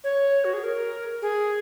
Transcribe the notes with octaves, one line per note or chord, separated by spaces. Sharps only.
C#5
F#4
G#4
A#4
G#4